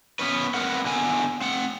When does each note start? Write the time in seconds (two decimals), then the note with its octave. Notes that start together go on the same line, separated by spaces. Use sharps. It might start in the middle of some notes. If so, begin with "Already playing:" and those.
0.19 B3 C#4 B4
0.54 C4 A#4 B4 F#5
0.86 D3 B3 G#5
1.41 C4 F#5